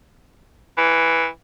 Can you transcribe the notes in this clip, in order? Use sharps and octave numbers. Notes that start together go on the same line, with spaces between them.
E3